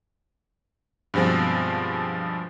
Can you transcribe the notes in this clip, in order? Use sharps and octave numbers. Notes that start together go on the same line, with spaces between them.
G2 B2 F3 G#3 C4